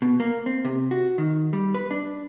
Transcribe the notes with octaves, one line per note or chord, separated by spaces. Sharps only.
B2
A#3
C4
C3
F#4
D#3
G3
B4
D4